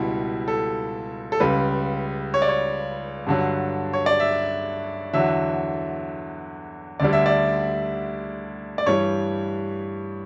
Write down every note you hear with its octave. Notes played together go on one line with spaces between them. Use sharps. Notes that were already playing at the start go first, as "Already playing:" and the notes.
Already playing: C#2 B2 G3 E4
A4
A4
C#2 C#3 G3 B4
C#5
D5
C#5
G2 D3 F#3
C#5
D5
E5
E2 D3 F#3 E5
D2 D3 G3 D5
E5
D5
D5
G2 E3 G3 C#5